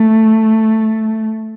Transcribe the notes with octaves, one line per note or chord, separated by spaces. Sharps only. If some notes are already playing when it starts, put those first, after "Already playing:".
Already playing: A3